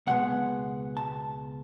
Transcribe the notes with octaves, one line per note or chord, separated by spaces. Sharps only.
C#2 B2 G#3 B3 F#5
A5